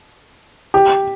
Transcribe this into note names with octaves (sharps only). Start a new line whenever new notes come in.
G4